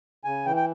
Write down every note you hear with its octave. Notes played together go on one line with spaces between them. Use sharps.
C#3 G#5
E3 G5
G5